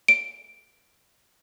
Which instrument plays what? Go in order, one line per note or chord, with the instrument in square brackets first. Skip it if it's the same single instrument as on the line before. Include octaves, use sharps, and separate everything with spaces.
[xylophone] D7